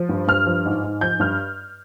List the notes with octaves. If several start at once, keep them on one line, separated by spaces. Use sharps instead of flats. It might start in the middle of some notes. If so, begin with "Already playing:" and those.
Already playing: F3
G2
G2 F6
F3
G#2
G#2
F3 G6
G2 F6